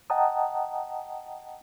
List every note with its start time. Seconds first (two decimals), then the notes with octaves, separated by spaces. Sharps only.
0.10 D#5 F#5 G5 A5 A#5 D#6